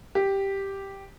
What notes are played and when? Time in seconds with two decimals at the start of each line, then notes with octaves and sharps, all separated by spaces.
0.15 G4